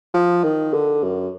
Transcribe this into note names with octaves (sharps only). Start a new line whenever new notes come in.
F3
D#3
D3
F#2